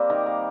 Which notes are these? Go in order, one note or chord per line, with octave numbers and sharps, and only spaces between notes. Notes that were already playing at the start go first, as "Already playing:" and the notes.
Already playing: G3 A#3 C4 G4
D#3 A#4
A#3